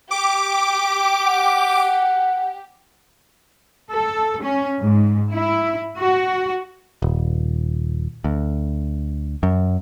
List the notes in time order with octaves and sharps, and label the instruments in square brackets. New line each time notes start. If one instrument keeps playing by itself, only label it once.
[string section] G4 [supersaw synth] D6
[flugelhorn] F#5
[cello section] A4
C#4
G#2
E4
F#4
[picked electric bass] D#1
D2
F#2